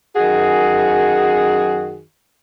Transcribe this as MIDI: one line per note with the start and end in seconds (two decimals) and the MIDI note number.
0.16 2.01 42
0.16 2.01 51
0.16 2.01 66
0.16 2.01 68